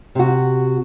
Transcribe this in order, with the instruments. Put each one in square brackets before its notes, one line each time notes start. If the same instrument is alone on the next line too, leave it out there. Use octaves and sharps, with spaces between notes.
[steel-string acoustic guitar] C3 F#4